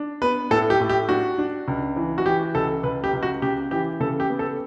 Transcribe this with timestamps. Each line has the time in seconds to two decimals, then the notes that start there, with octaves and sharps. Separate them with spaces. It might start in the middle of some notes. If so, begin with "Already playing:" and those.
Already playing: D4
0.22 B3 B4
0.51 A2 A4
0.70 G4
0.80 A2
0.89 G4
1.09 D4 F#4
1.38 D4
1.68 C#2
1.96 E3
2.18 F#4
2.26 E3 G4
2.55 C#2 A4
2.83 C#2 B4
3.04 G4
3.13 C#2
3.23 F#4
3.42 C#3 G4
3.71 E3 G4
4.00 C#3 A4
4.20 G4
4.30 B3
4.39 A4